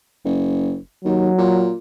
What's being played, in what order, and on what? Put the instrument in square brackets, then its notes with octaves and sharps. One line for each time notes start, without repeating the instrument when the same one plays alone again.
[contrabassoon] F#1
[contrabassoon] D#2 [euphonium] F#3
[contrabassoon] A#2